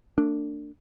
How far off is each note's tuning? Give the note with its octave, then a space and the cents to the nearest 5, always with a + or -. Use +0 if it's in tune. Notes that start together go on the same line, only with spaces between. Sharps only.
A3 +45 D4 +0